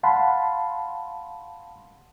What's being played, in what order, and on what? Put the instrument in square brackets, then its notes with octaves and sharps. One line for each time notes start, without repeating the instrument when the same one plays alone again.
[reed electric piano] F5 F#5 A5 B5 C6